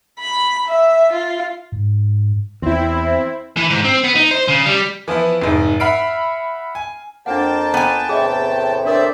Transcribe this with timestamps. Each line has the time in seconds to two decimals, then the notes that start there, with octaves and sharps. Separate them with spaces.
0.20 B5
0.67 E5
1.13 F4
1.72 G#2
2.62 E2 C4 E4
3.57 E3
3.70 G#2
3.85 C4
4.04 B3
4.16 D#4
4.31 C5
4.48 C#3
4.66 G3
5.08 E3 F3 B3 E4
5.42 F1 G#2
5.80 E5 F#5 B5 F6 C7 D7
6.75 G#5
7.26 F2 A#3 D4 F#5 G5 A5
7.74 B3 G#5
8.09 E2 A2 C3 G#4 D#5
8.85 D4 A4 A#4 C5 D5 E5